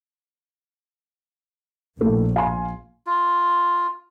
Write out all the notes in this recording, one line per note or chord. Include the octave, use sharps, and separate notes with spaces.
A#1 A2 A3 A#3
F5 G#5 C6
F4